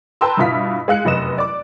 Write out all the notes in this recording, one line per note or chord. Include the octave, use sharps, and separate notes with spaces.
B4 G5 A5 A#5 C6 E6
G2 B2 E4 F4 B6
G#3 F5 F#6 C#7
F1 F#2 B4 D#5 E7
D5 D6